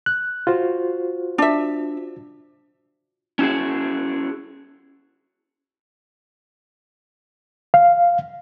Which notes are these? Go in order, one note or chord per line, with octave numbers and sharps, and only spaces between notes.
F#6
F4 F#4 C5
D4 E5
C#4 E4 F#4 G#4
F5